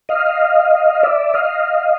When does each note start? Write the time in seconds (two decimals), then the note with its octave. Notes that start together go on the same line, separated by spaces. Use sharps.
0.09 D#5 F5
1.03 D5 E5
1.34 D#5 F5